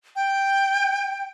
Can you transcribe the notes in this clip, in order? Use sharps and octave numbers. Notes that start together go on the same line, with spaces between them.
G5